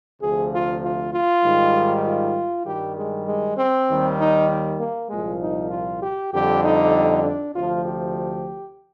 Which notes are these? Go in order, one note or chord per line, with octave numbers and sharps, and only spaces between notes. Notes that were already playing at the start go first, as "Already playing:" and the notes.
D2 C3 F3 G#4
F4
F4
F4
G#2 D#3 G3
F4
G2 D#3 G3 G4
G#3
G#3
C4
D#2 D#3 G3
D#4
A#3
C2 A#2 F3 G#3
D#4
F4
G4
F2 D3 G3 G4
D#4
D4
D2 C3 F3 F4
G4